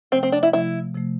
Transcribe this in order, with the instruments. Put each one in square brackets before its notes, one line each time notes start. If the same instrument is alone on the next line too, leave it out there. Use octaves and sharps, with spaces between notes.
[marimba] C3 F3 A3 [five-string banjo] C4
[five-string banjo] C4
D4
E4
[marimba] C3 F3 A3 [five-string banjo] E4
[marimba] C3 F3 A3